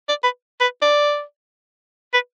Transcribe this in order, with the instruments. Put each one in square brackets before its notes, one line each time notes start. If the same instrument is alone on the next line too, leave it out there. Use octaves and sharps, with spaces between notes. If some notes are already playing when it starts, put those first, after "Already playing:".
[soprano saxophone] D5
B4
B4
D5
B4